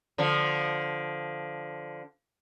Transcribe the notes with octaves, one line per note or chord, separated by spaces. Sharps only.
D3 F3